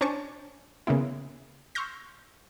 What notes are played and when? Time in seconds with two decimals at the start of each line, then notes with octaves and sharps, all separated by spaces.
0.01 C#4 D4 C5 G#5 A5 C#6
0.87 C#3 A#3 B3 E4
1.75 C6 C#6 E6 F6 G6 A#6